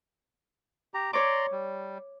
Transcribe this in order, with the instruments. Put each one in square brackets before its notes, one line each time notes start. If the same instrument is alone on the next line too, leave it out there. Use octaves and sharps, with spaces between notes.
[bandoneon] G4 A#5
[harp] C#5 D6 [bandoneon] D5 A#5 C6
[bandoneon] G3